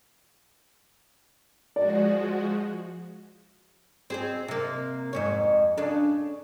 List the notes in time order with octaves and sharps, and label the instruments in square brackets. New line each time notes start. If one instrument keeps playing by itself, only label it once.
[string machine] F3 G#3 F#4 [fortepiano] D5
[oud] C4 G#4 C5
C3 A#3
F2 G#2 C#5
C#3 D4 A4